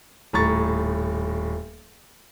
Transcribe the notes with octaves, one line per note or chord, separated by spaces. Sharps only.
D#1 A2 A#5 C#6 A6